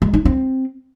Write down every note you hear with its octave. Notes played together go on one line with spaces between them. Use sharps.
G#3
D#4
C4